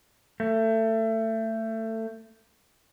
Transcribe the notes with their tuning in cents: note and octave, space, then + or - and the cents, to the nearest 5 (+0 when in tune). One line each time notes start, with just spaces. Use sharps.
A3 +25